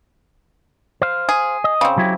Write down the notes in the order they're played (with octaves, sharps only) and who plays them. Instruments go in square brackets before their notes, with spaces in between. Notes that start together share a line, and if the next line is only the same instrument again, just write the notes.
[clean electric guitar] C5 F5
[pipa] G#4
[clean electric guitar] D#5
[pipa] C#3 C4
[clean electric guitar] F#3 E4 G4